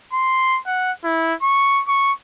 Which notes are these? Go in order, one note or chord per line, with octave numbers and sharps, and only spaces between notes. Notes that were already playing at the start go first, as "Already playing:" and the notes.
C6
F#5
E4
C#6
C#6